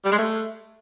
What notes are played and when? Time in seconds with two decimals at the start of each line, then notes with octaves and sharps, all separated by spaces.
0.05 G3
0.11 G#3
0.18 A3